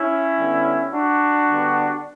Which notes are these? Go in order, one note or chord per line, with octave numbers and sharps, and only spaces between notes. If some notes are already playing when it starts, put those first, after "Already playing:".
Already playing: C#4 E4
D3 G3 B3
D4 F#4
D3 G3 B3